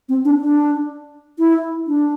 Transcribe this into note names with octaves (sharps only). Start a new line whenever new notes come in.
C4
D4
D4
E4
D4